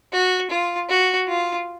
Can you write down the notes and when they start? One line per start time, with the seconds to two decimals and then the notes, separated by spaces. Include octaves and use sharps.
0.13 F#4
0.50 F4
0.89 F#4
1.28 F4